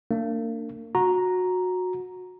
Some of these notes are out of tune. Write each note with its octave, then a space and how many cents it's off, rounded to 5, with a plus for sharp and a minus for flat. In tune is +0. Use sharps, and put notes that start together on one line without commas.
A#3 -35 D4 +0
F#4 -20 A#5 +0